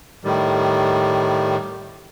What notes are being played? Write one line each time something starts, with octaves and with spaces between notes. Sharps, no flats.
A2 D#3 G3